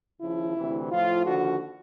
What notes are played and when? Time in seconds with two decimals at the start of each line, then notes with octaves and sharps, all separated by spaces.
0.21 D#2 C#3 F3 E4
0.56 D2 C3 E3
0.91 A2 F3 F4
1.25 D#2 D3 F3 F#4